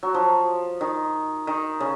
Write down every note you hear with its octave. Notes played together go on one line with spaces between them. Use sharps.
F#3
F3
D#3
D#3
C#3